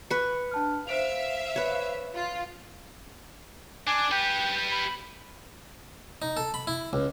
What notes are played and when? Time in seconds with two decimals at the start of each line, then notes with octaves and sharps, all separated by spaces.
0.10 B4 C#6
0.51 D4 A5 F6
0.87 C5 E5 F5 D7 F7
1.56 B4 C#5
2.14 F4
3.87 D4 G#5 D6
4.11 G4 B4 G5
4.72 B5
6.22 D#4
6.37 A4
6.54 B5
6.67 E4
6.93 C#2